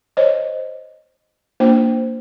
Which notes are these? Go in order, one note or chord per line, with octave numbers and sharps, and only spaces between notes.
C5 C#5 D#5
A#3 D4 F4 C5 G5